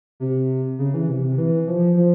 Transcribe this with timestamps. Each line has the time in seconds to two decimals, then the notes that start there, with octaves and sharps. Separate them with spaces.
0.20 C3
0.79 C#3
0.94 E3
1.08 C3
1.23 C3
1.38 E3
1.68 F3
1.97 F3